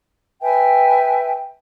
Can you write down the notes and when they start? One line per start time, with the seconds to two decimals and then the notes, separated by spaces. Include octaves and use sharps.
0.41 B4 E5 G5 G#5